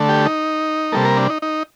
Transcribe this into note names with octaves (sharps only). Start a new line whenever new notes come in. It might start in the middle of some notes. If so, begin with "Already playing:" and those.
Already playing: D3 A3
G4
D#4
C3 G3 A#3 A4
A#4
D4
D#4
D#4